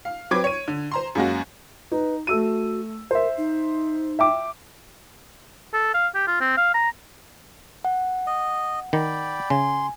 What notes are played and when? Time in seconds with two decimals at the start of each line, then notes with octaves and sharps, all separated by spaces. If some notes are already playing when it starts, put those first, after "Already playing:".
0.05 F5
0.31 F#3 C4 B4 D6 G#6 D7
0.44 C#5 D#7
0.68 D3
0.91 C5 A#5 C6
1.15 F#2 G#3 A#3 C#4 F#4
1.92 D#4 B4
2.27 A3 F#4 E6 D#7
3.11 A#4 C5 E5
3.37 D#4
4.19 E5 G5 D6
5.73 A4
5.94 F5
6.15 G4
6.27 F4
6.41 C4
6.57 F5
6.74 A#5
7.85 F#5
8.27 D#5
8.93 D#3 D5 G5 B5
9.50 C#3 G#5 C6